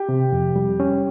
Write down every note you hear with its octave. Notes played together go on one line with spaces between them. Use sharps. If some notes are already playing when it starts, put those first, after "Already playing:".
Already playing: G4
C3
F2
G3
C#4